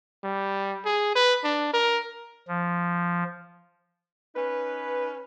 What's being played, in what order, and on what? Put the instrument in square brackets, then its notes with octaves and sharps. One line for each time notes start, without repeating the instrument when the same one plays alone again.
[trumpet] G3
G#4
B4
D4
A#4
[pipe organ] F3
[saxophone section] C#4 D#4 B4